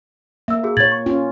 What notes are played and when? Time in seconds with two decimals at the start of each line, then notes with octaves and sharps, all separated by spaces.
0.48 A#3 E5 E6
0.63 F#4 G#4
0.77 A#2 C#5 G#6 A6 F#7
0.92 C#6
1.06 C#4 F4